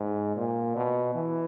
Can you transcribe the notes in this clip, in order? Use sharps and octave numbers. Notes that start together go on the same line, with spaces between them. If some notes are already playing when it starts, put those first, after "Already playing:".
Already playing: G#2
A#2
B2
E3